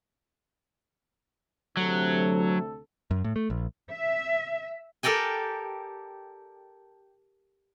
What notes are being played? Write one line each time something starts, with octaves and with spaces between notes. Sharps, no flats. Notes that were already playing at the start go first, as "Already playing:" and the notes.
D2 C3 F#3 A4
F#2
A2
A3
A#1
E5
G4 A4 A#4 D5 G5 G#5